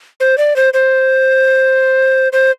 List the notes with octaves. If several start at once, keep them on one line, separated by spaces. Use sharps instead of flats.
C5
D5
C5
C5
C5